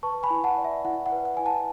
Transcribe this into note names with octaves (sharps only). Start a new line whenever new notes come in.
B4 A5 C#6
G#5 B5
E4
F#5 A5
D5
E5
E4 F#5
F#5
B4
F#5
E4 G#5
F#5 A5